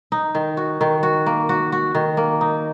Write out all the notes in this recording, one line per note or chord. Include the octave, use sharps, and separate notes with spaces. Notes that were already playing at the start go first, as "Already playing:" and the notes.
D#4
D#3
F#4
D#3
F#4
A#3
F#4
F#4
D#3
A#3
D#4